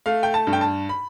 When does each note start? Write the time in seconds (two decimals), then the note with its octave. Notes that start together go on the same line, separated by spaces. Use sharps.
0.06 A3 F5
0.23 G5
0.34 A5
0.47 G2
0.53 G5
0.61 A5
0.89 B5